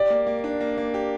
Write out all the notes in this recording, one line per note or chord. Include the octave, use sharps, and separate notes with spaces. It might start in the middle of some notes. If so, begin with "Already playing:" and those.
Already playing: G4 D5
A#3
A#3
D4
A#3
A#3
G4